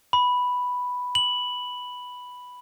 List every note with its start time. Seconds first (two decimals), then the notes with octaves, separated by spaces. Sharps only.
0.13 B5
1.15 F#7